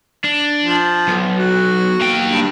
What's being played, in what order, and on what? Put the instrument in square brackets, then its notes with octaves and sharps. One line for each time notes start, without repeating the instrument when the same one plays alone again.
[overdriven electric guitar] D4
[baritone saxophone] F3
[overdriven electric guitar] B1
[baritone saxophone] F#4
[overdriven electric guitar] A#3 G5
[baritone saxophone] G2